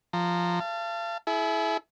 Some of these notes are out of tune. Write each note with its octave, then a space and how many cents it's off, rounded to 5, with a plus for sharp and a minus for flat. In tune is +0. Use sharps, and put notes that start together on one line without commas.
F3 +0 A#5 -15
F5 -35 A5 +10
E4 +0 G#4 +45